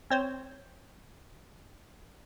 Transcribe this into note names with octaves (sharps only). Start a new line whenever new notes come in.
C4 C5 C#5